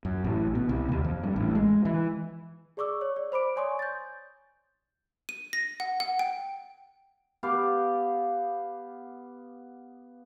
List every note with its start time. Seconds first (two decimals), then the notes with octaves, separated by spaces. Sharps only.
0.05 F#2
0.24 A1
0.55 B2
0.69 C2
0.92 D#2
1.04 F2
1.23 G2
1.36 A1
1.55 G#3
1.85 E3
2.77 G#4 D5 C#6 D6 E6
3.01 C#5
3.16 D5
3.32 C5 B5 D6 D7
3.56 C#5 D5 G#5 C6 C#6 D#6
3.79 G6 A6
5.29 D#7
5.53 A#6
5.80 F#5
6.00 F#5
6.19 G5
7.43 B3 G4 F5 D6